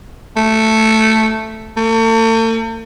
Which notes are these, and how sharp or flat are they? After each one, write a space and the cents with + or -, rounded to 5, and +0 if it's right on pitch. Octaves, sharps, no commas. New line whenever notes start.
A3 +5
A3 +45